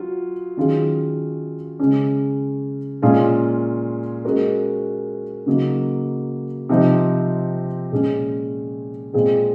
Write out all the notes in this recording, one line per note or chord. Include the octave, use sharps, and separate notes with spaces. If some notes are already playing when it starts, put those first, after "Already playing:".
Already playing: F#3 F4
D#3 F#3 C#4 F4 G#4
C#3 G#3 C#4 G#4
A#2 G#3 C#4 F4 G#4
G#3 C#4 F#4 A#4
C#3 F#3 A#3 D#4
C3 F3 C4 D#4
A#2 G#3 C#4
A#2 G#3 C4 F4 G#4